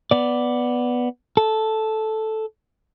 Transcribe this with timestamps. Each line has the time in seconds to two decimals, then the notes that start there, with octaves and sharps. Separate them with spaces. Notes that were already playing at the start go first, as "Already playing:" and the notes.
0.11 B3 D5
1.37 A4